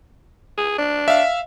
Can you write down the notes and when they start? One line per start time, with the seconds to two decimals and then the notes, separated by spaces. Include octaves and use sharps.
0.57 G#4
0.78 D4
1.08 E5 F5